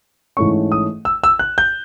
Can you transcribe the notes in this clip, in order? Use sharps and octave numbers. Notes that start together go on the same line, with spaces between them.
G#2 E3 A3 C#4 C#6
D#6
E6
E6
F#6
G6